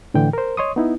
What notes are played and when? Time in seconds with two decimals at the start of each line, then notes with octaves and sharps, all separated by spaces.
0.14 A2 D3 E3 G5
0.33 A#4 C5
0.57 C#5 D#5 C6 C#6 D#6
0.76 B3 D#4 E4